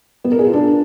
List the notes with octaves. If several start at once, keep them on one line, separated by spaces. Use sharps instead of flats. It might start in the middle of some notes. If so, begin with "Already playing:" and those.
B3
A#4
G#4
F4
D4